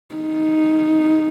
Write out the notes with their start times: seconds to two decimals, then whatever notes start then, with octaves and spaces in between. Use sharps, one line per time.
0.15 D#4